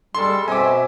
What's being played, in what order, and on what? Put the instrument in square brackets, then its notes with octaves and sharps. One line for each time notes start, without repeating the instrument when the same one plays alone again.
[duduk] G3 [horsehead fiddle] G#3 A4 [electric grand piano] C6
[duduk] B2 [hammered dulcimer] C4 [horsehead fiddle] E5 [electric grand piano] G#5 D6